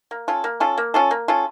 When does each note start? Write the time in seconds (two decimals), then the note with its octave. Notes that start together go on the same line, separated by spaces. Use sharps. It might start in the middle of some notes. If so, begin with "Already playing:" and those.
0.11 A#3
0.28 C#4 F4 A4
0.44 A#3
0.60 C#4 F4 A4
0.78 A#3
0.94 C#4 F4 A4
1.11 A#3
1.28 C#4 F4 A4